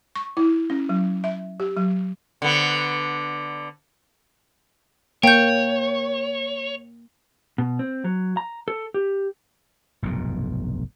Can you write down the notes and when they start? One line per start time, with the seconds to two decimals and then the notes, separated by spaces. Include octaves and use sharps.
0.16 C#6
0.37 E4
0.70 C#4
0.89 F#3
1.24 E5
1.60 G4
1.77 F#3
2.42 D3 B3
5.23 A#3 C#5 G5 G6
7.58 B2
7.79 C4
8.04 F#3
8.37 A#5
8.68 A4
8.94 G4
10.02 F1 B1 G2 A#2